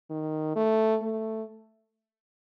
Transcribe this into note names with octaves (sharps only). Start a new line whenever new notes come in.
D#3
A3
A3